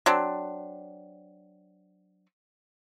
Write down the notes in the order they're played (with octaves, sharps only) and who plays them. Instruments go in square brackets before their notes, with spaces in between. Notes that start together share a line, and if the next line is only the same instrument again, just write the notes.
[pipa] F#3 C4 D4